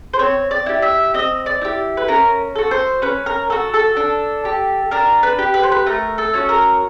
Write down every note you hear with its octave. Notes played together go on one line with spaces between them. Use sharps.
C5
C4 C#5
D5
E4 G4
E5
C4 D#5
D5
E4 G4
B4
C#4 A#4
F#4 A4
C5
C#4 B4
A#4
F#4 A4
A4
D4
G4
D4 A#4
B4
G4
B4
C5
B4
A3 A#4
A4
C#4 F#4
A#4